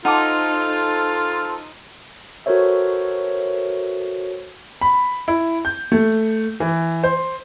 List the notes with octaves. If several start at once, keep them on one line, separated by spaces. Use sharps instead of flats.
D#4 F4 A4 C5 F#5 A5 D6
F#4 A4 A#4 C5 C#5 E5
B5
E4
G6
A3
E3
C5